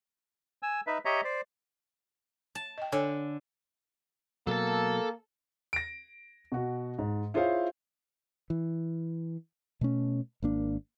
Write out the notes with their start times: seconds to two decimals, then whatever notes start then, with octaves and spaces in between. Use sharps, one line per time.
0.63 G#5 E6
0.87 D#4 B4 E5
1.05 G4 C#5 D#5 E5 A#5
1.24 C5 D5
2.55 A5
2.78 D#5 G5
2.92 D3 A4 C#5 G#5
4.47 B2 F#3 A#3 A4 A5
5.73 A#6 D7
6.52 B2 F#4
6.99 G#2
7.34 E4 F4 G#4 C5 C#5 F5
8.50 E3
9.81 B2 A3 C#4
10.43 G#1 A#3 D4